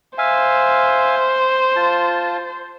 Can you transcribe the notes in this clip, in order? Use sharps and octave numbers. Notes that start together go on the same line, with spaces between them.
C5 E5 F5 G#5
F4 A5